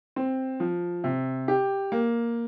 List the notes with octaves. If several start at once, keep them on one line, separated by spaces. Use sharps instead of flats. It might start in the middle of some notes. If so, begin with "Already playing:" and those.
C4
F3
C3
G4
A#3